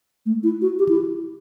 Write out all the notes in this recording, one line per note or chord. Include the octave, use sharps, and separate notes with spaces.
A3
E4
F#4
G4
E4